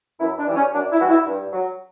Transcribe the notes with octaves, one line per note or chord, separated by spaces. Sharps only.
F#2 E4
D4
E3 G3
C#4
F#2 D4
E4
E3 G3 F#4
E4
G2
F#3